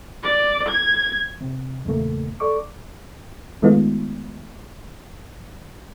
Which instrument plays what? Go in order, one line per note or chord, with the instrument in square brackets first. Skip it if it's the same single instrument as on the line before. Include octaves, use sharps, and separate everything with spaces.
[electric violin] D5
G#6
[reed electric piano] C3
E2 A#2 C#3 A3 A#3
A4 D5 C#6 D6
[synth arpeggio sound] D#3 G#3 A3 B3 D#4 F4